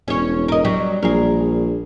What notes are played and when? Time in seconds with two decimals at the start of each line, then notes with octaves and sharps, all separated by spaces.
0.08 E1 C#4 C#5
0.48 A#4 D#5
0.65 F#3 G3
1.03 A#1 G#4 A#4